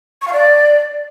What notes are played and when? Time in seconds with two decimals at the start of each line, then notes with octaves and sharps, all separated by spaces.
0.22 C#6
0.27 F5
0.33 D5